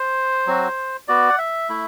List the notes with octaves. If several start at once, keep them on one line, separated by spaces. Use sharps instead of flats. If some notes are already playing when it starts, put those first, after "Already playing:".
Already playing: C5
F#3 C4 F#4
B3 F#4 D5
F#5
E5
A3 E4